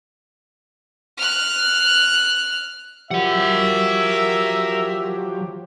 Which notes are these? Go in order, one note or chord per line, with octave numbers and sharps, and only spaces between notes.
F6 F#6
F3 F#3 G4 A#4 E5 F#5